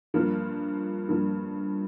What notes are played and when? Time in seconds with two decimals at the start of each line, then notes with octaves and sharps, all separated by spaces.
0.14 G2 F3 A#3
1.09 G2 F3 A#3